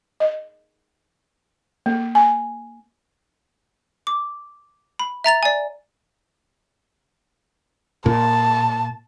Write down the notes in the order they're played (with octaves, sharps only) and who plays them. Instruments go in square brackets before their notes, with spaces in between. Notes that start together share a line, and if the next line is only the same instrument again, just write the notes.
[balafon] D#5
A#3
G#5
[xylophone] D6
B5
E5 A#5 A6 F7
D5 G#5
[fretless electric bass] A#2 [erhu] A5